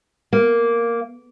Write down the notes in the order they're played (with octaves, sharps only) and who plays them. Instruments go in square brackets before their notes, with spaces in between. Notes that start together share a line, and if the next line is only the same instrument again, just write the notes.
[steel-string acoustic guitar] A#3